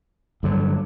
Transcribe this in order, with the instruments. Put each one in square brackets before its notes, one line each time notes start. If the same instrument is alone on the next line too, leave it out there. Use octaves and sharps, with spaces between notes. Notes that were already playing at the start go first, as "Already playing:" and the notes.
[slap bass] G2 D3 F#3